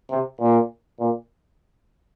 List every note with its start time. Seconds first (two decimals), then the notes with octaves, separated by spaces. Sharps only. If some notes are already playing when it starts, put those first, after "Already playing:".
0.10 C3
0.40 A#2
0.99 A#2